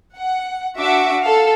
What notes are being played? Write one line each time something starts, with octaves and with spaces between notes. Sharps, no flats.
F#5
D4 F#4 E5 D6
A4 F5